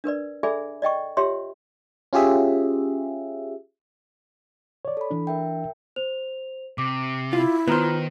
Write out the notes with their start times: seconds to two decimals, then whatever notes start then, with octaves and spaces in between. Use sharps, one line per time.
0.04 D4 A#4 B4 D5
0.43 G#4 A4 D5 E5 G#5 B5
0.82 D5 D#5 G5 C#6
1.17 F4 G4 C#5 E5 C6
2.13 C#4 F4 G4 G#4 E5
4.85 C#5 D5
4.97 A4 B5
5.11 E3 D4
5.27 A#4 E5 G5
5.96 C5 F7
6.78 C3 D6
7.33 E4 F4
7.68 D#3 B3 F4 C5 A#5 F6